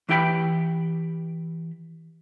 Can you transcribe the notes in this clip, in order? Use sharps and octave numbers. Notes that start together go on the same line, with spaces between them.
E3 E4 G4 G5 A5 B5